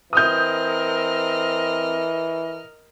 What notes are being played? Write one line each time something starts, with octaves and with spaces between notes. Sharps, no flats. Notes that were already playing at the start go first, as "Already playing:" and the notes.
E3 C4 A#4 D#5 D#6 F6 G6